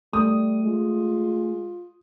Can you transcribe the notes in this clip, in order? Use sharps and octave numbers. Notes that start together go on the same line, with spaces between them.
G3 A3 D#6
G#3 F4